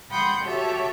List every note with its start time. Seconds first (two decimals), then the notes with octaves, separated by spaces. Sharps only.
0.10 F#5 G5 B5 C6 D#6 G6
0.44 F#4 G4 A4 C#5 E5